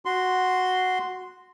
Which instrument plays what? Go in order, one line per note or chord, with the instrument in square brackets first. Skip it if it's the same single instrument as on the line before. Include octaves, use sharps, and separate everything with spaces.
[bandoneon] F#4 C6